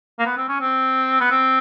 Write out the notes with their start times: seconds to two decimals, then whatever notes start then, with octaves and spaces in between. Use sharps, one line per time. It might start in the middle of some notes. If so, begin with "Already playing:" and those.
0.19 A#3
0.26 B3
0.37 C4
0.49 C#4
0.61 C4
1.21 B3
1.31 C4